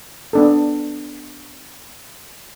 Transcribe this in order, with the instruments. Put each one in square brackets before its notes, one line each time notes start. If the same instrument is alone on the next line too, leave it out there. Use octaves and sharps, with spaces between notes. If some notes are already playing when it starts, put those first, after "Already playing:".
[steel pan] B3 D4 A4